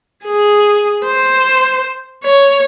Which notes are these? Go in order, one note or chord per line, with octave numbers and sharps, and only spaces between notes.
G#4
C5
C#5